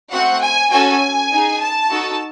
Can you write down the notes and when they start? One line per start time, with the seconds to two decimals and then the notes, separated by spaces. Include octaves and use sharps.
0.12 A3 C4 F#4 F#5
0.42 G#5
0.72 C#4 F#4 A4 G#5
1.32 D#4 G#4
1.62 A5
1.90 D#4 F#4 A4